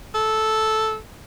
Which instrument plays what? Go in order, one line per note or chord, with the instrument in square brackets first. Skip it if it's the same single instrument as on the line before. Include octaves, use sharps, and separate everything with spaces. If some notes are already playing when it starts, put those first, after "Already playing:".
[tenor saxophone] A4